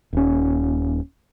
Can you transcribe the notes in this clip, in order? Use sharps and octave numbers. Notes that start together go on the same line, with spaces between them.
D#1 C#4